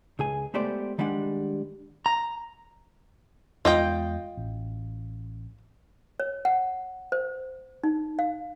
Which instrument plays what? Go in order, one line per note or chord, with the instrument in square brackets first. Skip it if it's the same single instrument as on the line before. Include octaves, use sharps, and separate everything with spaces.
[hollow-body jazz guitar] C#2 G#4 G#5
G#3 A3 B3 G4 C5 D5
D#3 G3 G#3 D4 F#5
[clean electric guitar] A#5
[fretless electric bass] E2 G#3 [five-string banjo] F4 D#5 G5
[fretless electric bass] A1
[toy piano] C#5
F#5
C5
D#4
F5